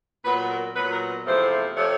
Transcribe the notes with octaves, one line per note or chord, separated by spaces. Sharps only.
A#2 F#3 B3 B4
A#4
A#2 F#3 B3 B4
A#4
E2 C3 F3 A3 C5
C3 F3 A3 C#5